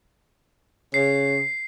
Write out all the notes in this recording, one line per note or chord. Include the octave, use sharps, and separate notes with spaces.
C#3 C7